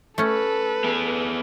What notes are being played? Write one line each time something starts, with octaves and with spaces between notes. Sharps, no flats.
A3 C#4 A4 B4
B3 G#4